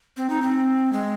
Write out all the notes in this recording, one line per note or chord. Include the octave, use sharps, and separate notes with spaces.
C4
D#4
C4
G#3